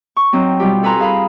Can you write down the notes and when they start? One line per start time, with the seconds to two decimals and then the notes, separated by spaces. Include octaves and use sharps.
0.17 C#6
0.33 F#3 C4 D#4
0.60 B2 G3 F4 G4
0.83 A4 B4 G#5 A#5 C6
1.00 G#4 F5 A#5 B5